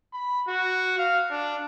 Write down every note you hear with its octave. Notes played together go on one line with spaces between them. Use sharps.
B5
F#4
F5
D4